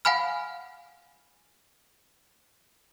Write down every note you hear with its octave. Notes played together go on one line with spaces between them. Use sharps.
F5 F#5 G#5 B5 F6